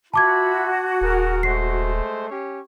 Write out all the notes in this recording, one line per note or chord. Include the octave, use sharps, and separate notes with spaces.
F4 F#4 E5 A5 B5 D6 G#6
D#1 G#4 A#4
G#3 A3 C5 C7
C#4 G4 C#5